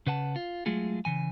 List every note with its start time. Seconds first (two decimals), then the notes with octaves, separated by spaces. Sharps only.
0.07 C#3 B4 F#5 A5
0.36 F4
0.66 F#3 G#3 A3 F4 G#4
1.05 C#3 E3 G#5